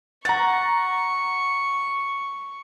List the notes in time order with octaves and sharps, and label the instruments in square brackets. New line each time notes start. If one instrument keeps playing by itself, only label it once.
[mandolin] F#5 [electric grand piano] A#5 A6 [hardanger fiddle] C#6